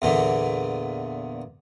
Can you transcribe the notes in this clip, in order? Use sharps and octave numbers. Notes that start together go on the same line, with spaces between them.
E2 A#2 D3